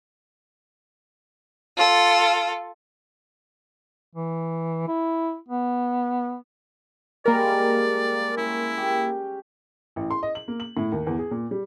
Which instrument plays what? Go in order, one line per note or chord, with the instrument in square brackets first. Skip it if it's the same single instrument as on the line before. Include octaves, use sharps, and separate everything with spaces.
[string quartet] F4 A4
[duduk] E3
E4
B3
[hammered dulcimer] G3 G#3 [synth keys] A#3 A#4 [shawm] D5
[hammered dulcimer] C#4 [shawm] E4
[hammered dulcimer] G4 G5
[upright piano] A1
C6
D#5
F#7
A#3
F#7
A2
D#2
E2
G#4
A#2
G3